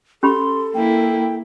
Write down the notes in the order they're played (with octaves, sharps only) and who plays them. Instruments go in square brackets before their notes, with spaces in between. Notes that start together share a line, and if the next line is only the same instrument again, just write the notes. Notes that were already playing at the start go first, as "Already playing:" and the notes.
[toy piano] C#4 G4 B5 [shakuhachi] A4 [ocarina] C6
[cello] A#3 E4 [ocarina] G5